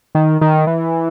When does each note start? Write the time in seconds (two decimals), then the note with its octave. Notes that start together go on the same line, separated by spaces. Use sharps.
0.15 D#3
0.41 D#3
0.67 E3